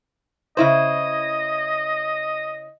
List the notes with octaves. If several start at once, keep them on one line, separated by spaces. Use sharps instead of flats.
C#3 E4 C5 D#5